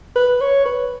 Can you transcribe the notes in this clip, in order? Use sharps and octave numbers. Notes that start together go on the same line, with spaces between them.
B4
C#5
B4